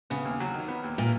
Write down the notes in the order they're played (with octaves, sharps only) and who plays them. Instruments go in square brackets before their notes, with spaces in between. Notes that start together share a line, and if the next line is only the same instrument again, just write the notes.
[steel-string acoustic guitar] C#3 [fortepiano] B3
[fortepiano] D#2
F#3
D#3
B3
D#2
[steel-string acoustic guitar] A#2